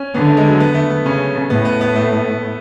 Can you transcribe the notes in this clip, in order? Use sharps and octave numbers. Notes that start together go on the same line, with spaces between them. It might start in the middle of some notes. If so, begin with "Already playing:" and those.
Already playing: C#4
D3 B3
A3
G#3
F#3
B3
A3
B3
C#3 C#4
A2 B3
B3
B3
A3